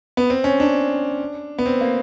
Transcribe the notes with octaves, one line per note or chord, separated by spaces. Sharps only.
B3
C4
C#4
D4
B3
C4
A#3